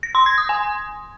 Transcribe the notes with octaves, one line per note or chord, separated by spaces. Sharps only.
A#6
C6
G#6
D#6
G#5